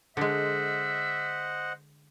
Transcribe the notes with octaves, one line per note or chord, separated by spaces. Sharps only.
D3 G#3 C5 D#5 E5 F#5